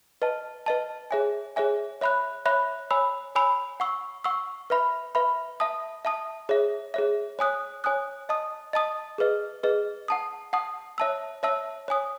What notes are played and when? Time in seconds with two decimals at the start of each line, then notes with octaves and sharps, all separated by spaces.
0.22 B4 D#5 A5
0.66 B4 D#5 A5
1.11 G#4 C#5 E5 G#5
1.56 G#4 C#5 E5 G#5
2.01 C#5 E5 B5 F#6
2.46 C#5 E5 B5 F#6
2.91 C#5 G#5 B5 E6
3.35 C#5 G#5 B5 E6
3.80 F#5 C#6 E6
4.24 F#5 C#6 E6
4.70 B4 E5 B5
5.15 B4 E5 B5
5.60 E5 A5 D#6
6.05 E5 A5 D#6
6.49 G#4 C#5 E5
6.94 G#4 C#5 E5
7.39 C#5 G#5 D#6 F#6
7.84 C#5 G#5 D#6 F#6
8.29 D#5 A5 D#6
8.73 D#5 A5 D#6
9.18 G#4 B4 D#5
9.63 G#4 B4 D#5
10.08 F#5 A5 D#6
10.53 F#5 A5 D#6
10.98 C#5 E5 A5 E6
11.43 C#5 E5 A5 E6
11.88 C#5 G#5 D#6